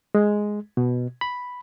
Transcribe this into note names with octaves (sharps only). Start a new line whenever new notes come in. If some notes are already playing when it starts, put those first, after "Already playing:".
G#3
B2
B5